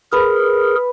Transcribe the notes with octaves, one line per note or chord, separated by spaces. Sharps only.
G#4 A#4 B4